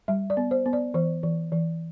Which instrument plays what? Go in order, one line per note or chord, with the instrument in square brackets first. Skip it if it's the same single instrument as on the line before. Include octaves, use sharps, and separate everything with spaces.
[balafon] G3 E5
D5
B3
C5
B3
D5
E3 C5
E3
E3